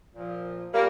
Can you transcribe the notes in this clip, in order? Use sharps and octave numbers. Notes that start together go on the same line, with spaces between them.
A#2 F3
A#2 G3 A#3